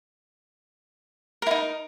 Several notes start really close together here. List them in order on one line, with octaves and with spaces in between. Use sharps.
A#4 E4 D#4